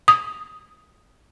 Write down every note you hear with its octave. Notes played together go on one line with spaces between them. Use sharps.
D#6